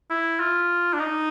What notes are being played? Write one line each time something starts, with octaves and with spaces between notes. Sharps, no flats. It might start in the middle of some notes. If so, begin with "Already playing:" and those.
E4
F4
D4
D#4